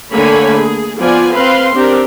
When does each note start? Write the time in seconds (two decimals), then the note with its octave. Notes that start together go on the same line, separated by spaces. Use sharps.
0.12 D3 A3 A#3 C#5 G#5 B5
0.56 G#4
0.99 F3 B3 F4 D5 G#5
1.32 C4 B4 F5 C6
1.73 C4 D4 G4 A#4